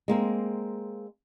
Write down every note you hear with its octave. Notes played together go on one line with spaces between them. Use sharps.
G#3 A#3 C4